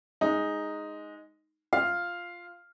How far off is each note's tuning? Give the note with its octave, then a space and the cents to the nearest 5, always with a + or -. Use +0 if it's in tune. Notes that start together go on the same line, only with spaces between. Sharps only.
G#3 +0 D#4 +0
F4 +0 F5 +0